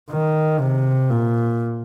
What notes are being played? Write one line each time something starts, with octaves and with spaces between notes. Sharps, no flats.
D#3
C3
A#2